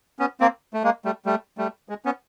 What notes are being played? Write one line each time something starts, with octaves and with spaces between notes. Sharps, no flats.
B3 C#4
A#3 C4
A3
G#3 A#3
G3 A3
G3 A3
G3 A3
G#3
B3 C#4